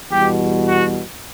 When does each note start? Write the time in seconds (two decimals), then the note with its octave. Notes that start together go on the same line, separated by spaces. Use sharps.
0.11 E2 B2 G3 G4
0.67 F#4